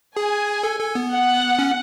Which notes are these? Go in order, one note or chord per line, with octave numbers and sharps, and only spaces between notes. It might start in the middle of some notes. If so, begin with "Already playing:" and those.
G#4 G#5
A4
A4
B3
F#5
C#4